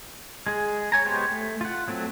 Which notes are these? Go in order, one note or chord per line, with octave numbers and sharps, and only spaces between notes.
G#3 G#4
C#5 G#5 A#5
G#3 B3 G4 C5 C#5
A3
F4 F#5
F#3 A3 C4